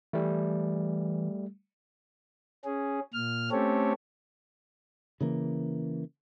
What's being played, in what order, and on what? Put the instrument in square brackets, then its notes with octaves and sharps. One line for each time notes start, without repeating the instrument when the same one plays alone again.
[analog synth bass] E3 [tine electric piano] G3 A3
[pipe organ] C#4 G#4
A#2 F6
A3 C4 C#4 G4 A4 C#5
[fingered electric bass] C#3 E3 A#3